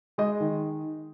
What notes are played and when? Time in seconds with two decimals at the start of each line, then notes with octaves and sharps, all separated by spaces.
0.18 G#3 D#5
0.40 D#3